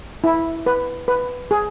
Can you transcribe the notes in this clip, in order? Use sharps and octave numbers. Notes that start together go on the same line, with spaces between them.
E4
B4
B4
G#4